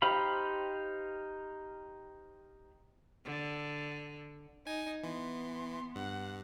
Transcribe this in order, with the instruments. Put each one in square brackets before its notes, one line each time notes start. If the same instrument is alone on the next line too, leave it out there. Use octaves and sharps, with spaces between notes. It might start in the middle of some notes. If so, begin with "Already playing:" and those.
[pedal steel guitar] D#4 G4 C5 F5 B5
[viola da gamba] D3
[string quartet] D#4 [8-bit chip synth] G#5
[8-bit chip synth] E3 [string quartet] B3 [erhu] C6
[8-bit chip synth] G2 [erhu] F#5